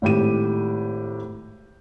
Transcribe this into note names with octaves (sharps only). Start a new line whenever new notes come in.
G#1 A2 G4 D#7